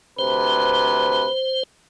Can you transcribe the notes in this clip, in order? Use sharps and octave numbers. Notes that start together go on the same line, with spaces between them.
D2 C3 B4 C5